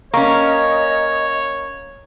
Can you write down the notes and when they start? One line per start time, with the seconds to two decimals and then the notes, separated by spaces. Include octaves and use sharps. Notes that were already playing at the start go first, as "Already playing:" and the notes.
0.14 A#3 C#4 C#5 D#5 A#5 C#6